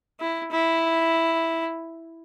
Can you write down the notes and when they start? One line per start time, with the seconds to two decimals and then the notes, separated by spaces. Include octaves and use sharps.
0.20 E4
0.52 E4